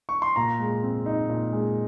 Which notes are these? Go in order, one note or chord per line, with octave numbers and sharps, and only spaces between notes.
C#6
C6
A#2 A#5
G#3
C4
D#4
A#2
G#3